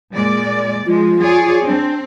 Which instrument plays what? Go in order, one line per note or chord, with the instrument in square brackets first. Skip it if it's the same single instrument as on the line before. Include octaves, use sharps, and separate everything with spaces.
[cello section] A#2 G#3 D5
[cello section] F3 G#3 [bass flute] F4
[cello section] G#4 C#5 D5
[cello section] C4 [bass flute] D4